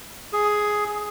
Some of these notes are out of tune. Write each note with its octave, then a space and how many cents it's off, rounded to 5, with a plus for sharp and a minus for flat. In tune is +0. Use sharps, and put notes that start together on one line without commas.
G#4 +5